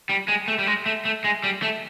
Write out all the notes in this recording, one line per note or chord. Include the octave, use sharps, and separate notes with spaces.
G3
G#3
A3
G3
G#3
A3
A3
G#3
G3
A3